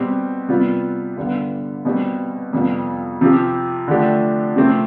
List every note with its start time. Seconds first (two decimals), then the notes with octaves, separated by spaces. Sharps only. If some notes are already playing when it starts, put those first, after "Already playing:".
Already playing: B2 G3 C4 G4
0.49 C3 G3 B3 F4
1.17 G2 D3 G3 B3
1.85 B2 G3 C4 G4
2.53 F2 C3 G3 B3
3.21 C3 F3 C4 G4
3.88 D3 F3 A3 D4 G4
4.56 C3 F3 A3 C4 G4